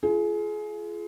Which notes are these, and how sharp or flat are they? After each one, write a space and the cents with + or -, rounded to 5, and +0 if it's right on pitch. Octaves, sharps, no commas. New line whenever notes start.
F4 -25 G#4 +30